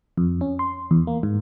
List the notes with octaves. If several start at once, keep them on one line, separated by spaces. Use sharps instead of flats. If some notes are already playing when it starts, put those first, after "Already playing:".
F2
C#4
C6
E2
A#3
G#2